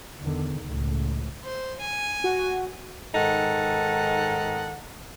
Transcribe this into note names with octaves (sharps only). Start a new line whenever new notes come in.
E2 D3 D#3
C#2 A2
C5
G#5
F#4
G#2 D#3 D#4 A4 F#5